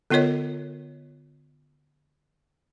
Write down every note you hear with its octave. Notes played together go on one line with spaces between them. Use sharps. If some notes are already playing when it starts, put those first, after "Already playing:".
D3 B3 F4 A#4 C#5 D#5